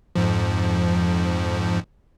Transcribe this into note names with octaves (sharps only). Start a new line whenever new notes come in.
F2 G#2 F3